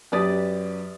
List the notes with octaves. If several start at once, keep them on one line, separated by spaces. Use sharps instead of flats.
F#2 G4 B4 D5 D#6 A6